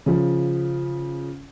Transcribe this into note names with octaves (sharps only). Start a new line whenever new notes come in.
C#3 F3